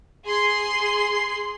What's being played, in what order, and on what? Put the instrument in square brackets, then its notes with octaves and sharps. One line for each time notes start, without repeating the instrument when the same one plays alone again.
[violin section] G#4 C6